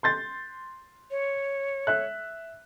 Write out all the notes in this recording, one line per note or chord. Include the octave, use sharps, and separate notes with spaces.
C6 G6 A6
C#5
E5 F#6